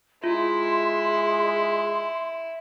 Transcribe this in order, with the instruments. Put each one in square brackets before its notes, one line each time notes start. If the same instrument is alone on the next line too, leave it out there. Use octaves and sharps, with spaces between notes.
[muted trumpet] G#3 [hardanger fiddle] E4 [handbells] F4 [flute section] C6